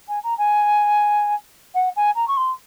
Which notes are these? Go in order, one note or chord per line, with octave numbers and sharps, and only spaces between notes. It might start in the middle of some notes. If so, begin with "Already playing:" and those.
G#5
A#5
G#5
F#5
G#5
A#5
C#6
C6